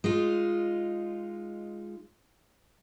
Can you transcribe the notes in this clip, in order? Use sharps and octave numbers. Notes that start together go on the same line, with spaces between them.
G#3 D#4 F4